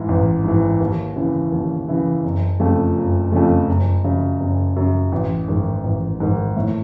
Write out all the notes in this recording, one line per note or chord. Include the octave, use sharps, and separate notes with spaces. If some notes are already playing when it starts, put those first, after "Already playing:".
Already playing: G#2 E3
A1
G#2 E3
D#2
C#3 E3
D#2
C#3 E3
F#1
F2 C#3 F3 A3
F#1
F2 C#3 F3 A3
F#1
F#2 C#3
F#1
F#2 C#3
A1
G#2 D#3
A1
G#2 D#3
A2